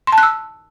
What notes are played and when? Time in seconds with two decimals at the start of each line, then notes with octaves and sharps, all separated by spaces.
0.07 C6
0.13 A5
0.18 F#6
0.23 E6